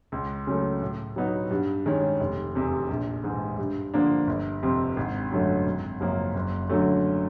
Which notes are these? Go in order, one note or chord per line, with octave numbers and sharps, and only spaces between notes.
C#2
C#3 F#3 A3
A2
F#3 B3 D#4 F#4
G2
D#3 G#3 C#4
F1
E2 C3
A#1
G#2 E3
G2
D3 F3 A#3 D4
G1
F2 C3 F3
G#1
F#2 D3 F#3 A3
G#1
F#2 C#3 F3 A#3
F#1
F#2 D3 F#3 A3